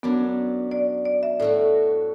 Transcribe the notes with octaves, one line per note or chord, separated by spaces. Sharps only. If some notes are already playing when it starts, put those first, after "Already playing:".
F#2 F#3 B3 D4
D5
D5
E5
A2 A3 F#4 D5